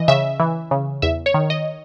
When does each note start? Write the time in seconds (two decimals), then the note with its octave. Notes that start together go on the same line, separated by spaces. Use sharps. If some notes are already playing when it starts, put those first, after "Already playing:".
Already playing: E3 D#5
0.08 C#3 E5
0.40 E3
0.71 C#3
1.02 E2 E5
1.26 C#5
1.34 D#3
1.50 D#5